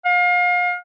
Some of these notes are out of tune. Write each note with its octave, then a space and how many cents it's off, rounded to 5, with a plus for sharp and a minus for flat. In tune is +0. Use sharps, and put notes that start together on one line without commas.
F5 +35